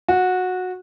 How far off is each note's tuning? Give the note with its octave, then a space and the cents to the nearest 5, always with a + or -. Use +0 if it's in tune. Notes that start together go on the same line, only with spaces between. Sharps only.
F#4 -15